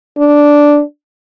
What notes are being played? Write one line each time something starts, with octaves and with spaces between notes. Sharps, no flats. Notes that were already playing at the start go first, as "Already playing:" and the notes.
D4